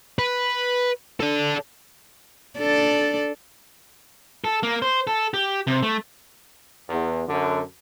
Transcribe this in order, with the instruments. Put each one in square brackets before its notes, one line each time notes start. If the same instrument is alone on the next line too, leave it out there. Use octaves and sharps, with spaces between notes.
[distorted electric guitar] B4
A4 D5
[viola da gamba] D4 A4 D5
[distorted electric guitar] A4
A#3
C5
A4
G4
C3
A3
[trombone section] E2
F#2 D3